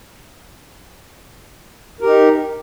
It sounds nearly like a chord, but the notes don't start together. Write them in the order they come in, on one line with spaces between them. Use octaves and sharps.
A#4 G4 D#4